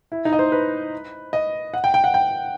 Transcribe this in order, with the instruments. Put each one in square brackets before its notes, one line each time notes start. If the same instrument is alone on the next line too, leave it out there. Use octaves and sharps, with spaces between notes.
[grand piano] E4
D#4
D#5
C5
B4
D#5
F#5
G5
G5
F#5
G5